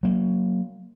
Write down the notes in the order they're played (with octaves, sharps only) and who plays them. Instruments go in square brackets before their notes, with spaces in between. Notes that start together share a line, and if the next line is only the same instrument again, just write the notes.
[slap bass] F#3 A#3